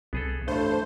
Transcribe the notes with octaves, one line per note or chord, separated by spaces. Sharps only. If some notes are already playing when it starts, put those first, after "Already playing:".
C2 B3 G#4 A4
A1 G2 A3 D4 C5 G6